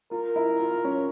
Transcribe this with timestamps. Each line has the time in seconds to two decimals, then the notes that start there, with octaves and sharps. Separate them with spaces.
0.11 F4 A#4
0.36 E4
0.60 F4
0.84 C#4